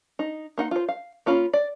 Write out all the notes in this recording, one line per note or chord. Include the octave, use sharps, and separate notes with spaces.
D#4
A#3 D#4 F#5
F4 C5
F5
A#3 C#4 F4 B5
D5